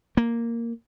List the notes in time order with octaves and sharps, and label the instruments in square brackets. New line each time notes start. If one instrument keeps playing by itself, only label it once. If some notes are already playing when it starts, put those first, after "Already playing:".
[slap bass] A#3